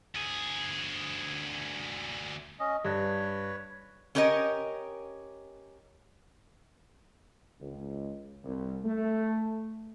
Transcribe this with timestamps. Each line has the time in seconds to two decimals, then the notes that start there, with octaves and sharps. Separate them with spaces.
0.15 D2 G#4
2.60 C#4 D#5
2.85 G2 B4 C#5
4.15 C#4 G4 A#4 C#5 D#5
7.61 C#2
8.44 C2
8.84 A3